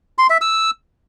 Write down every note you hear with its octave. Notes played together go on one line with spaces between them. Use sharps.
C6
E5
E6